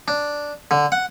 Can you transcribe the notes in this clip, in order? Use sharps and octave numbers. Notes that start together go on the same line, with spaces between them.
D4
D3
F#5